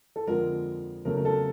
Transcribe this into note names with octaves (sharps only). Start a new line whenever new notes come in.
A4
F2 D3 F3 G#3 A#4
E2 C#3 F#3 A3 A#4
A#4
A4